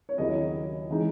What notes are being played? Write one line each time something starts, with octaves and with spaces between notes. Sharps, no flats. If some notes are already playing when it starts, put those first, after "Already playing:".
C#5
D#2 C#3 F#3 A#3 E4 D#5
E3 G#3 D#4